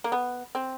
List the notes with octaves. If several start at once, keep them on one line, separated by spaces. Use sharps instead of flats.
A#3
B3
C4